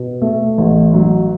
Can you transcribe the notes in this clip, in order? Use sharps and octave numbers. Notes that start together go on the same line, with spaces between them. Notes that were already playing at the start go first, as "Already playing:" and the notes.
Already playing: B2
A3
A1
F#3